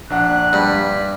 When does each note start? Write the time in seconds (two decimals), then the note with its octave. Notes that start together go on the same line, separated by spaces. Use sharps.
0.10 A#1 D4 F#5 F#6
0.53 G2 B5